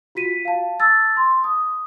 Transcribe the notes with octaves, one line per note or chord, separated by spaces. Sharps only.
F4 F#4 B6 D#7
F5 A5
A5 E6 A6
C6
D#6